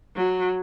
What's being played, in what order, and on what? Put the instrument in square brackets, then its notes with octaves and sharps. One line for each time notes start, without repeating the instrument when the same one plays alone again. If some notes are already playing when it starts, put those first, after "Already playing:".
[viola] F#3